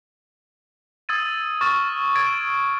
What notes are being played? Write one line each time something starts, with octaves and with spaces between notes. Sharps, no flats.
D#6 E6 G#6 A6 D#7
C#6 F6 A6 E7
E6 G#6 A6 D7